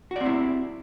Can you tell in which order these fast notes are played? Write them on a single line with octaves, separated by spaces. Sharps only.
F#4 D5 C4 E4